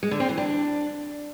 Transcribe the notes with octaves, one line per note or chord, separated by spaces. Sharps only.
G#3
D3
C4
E3
D4